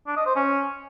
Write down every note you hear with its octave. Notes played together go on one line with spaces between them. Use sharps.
D4
D#5
C5
C#4